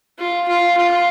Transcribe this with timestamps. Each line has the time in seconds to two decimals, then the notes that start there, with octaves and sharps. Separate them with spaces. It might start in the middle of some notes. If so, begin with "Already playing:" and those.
0.18 F4
0.48 F4
0.77 F4